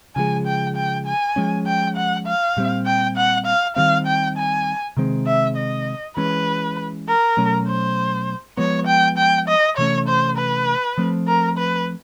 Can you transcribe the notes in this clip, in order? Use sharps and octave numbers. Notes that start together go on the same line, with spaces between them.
C#3 F3 G#3 G#5
G5
G5
G#5
F3 G#3 C#4
G5
F#5
F5
A#2 G3 C4
G5
F#5
F5
D#3 G3 C4 F5
G5
G#5
C3 D#3 G#3 C4
E5
D#5
E3 G#3 C#4 B4
A#4
B2 F#3 A3 C#4
C5
F3 G#3 B3 C#5
G5
G5
D#5
C3 E3 A3 C#4 C#5
C5
B4
F3 A3 C4
A#4
B4